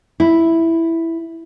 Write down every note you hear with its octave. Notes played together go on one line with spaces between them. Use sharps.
E4